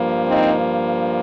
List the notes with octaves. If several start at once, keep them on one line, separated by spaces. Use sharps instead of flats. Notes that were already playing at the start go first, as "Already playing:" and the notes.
Already playing: G2 F3 A#3
C4 D#4